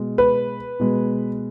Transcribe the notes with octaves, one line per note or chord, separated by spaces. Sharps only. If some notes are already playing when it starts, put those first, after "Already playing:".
Already playing: B2 G#3
B4
B2 G#3